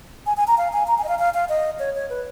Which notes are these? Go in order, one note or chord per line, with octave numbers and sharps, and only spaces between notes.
G#5
G#5
A#5
F5
G#5
A#5
G#5
D#5
F5
F5
F5
D#5
C#5
C#5
B4